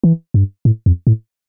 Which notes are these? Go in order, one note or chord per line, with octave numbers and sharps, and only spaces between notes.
E3
G2
A2
F2
A2